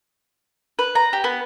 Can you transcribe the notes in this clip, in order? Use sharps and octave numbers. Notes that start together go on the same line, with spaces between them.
B4
A#5
G4
B3